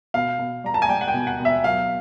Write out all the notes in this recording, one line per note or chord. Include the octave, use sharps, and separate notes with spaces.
B2 F5
B2
G3 A#5
A5
G#5
G3 G5
F#5
G5
B2
F#5
B2
E5
F#3 F5